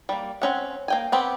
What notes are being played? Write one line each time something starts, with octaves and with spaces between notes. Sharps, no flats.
G3 A#3
C4 C#4 F#5
A#3 G5 G#5
B3 C4 G4